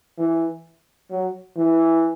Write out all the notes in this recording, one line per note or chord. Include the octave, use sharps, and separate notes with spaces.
E3
F#3
E3